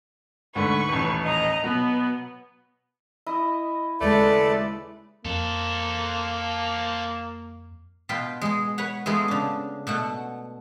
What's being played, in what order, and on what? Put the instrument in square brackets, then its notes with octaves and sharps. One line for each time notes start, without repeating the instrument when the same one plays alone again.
[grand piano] D2 G#2 D3 [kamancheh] B4 C#6
[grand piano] D#1 A1
[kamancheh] D#5 A#5
[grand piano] B2 F#3 [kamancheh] B3
[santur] E4 [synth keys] D#5
[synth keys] D#2 C#3 G#3 [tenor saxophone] A3 [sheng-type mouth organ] A4 B4 D5
[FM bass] F2 [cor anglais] A#3 [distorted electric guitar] A4 C5
[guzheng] B2 F4 B4 G5 C6
G#3 G#4
B4 C#5 F#5
G#3 A3 B3 F4 G#4
C#3 D4
B2 A3 F#5